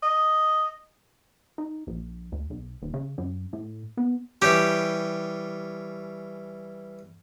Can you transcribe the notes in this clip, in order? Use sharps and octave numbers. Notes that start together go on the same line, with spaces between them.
D#5
D#4
A#1
D2
B1
D#1
C#3
F#2
A2
B3
E3 G3 C#4 G4